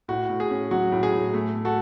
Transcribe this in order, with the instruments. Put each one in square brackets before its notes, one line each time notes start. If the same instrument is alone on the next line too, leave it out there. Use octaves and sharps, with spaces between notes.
[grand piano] A2 F#4
A2
G#4
C#4
F#3 F#4
A2
G#4
A2
A3
A3
F#4 A4